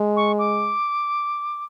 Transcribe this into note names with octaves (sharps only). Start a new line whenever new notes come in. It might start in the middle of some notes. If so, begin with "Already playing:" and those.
Already playing: G#3
C#6
D6